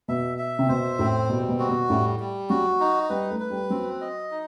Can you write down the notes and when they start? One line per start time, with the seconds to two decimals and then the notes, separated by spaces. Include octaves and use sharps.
0.08 B2 E5
0.38 E5
0.59 C3
0.69 B2 C5
0.99 A2 C4
1.29 B2 G3
1.49 B2
1.59 F#4
1.69 B2
1.89 A2 G3
2.20 G3
2.50 F#3 F#4
2.80 D#4
3.10 G3 B4
3.30 A3
3.40 B4
3.50 G3
3.70 F#3 C4
4.01 D#5
4.31 D#4